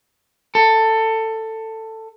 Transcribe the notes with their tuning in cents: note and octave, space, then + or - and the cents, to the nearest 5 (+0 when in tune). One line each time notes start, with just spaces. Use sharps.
A4 +15